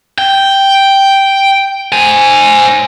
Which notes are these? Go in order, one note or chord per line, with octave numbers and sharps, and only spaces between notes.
G5
C5 G#5